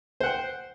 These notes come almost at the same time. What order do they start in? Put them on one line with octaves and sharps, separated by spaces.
C5 F#5 G5